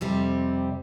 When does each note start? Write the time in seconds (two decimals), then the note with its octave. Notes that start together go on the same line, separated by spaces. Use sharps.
0.01 F2 C3 G3 C4